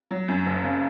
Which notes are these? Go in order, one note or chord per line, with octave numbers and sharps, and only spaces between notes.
F#3
F#2
F#1
C#3